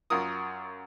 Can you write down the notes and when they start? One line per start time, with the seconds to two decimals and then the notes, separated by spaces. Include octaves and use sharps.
0.10 F#2 F4 A#4 D#6